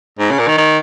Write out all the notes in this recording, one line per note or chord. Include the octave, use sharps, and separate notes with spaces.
G#2
C#3
A#2
D#3
D#3